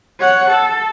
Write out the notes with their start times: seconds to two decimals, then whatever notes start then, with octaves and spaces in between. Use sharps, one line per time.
0.20 C#5 F#5
0.50 A4